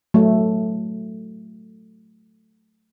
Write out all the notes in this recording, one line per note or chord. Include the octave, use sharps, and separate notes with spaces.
F#3 A3